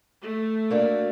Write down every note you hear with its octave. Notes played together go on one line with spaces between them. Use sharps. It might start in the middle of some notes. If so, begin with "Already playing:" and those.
A3
A#3 D4 F#4